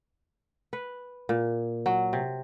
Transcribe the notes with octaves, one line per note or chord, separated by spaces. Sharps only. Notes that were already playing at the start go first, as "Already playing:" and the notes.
B4
A#2
F#3
C3